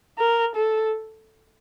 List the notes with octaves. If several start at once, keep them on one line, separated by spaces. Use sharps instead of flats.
A#4
A4